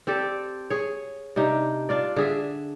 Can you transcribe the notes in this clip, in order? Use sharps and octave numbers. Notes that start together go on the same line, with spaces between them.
C4 G4 A4 D5
G#4 C#5
C3 D4 D#4 G4
D4 F4 D5
D3 G#4 E5